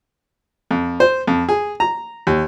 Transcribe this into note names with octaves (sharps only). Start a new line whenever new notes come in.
F2
C5
F2
G#4
A#5
D#2